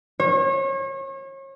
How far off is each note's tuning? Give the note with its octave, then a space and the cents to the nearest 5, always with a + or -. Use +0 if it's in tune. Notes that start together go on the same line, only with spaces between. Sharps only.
C#5 -35